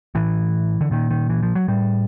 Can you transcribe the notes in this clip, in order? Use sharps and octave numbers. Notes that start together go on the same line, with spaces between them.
A2 E3
D3
A#2 D#3
D#3
E3
F3
F#3
A2 G3